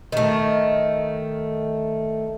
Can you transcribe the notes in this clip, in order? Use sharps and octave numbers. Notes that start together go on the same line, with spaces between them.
D#3 A3